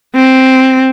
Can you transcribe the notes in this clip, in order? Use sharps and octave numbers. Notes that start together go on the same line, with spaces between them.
C4